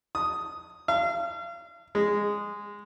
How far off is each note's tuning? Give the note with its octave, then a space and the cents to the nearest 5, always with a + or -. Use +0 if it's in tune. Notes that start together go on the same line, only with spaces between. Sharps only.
D#6 +0
F5 -35
G#3 -15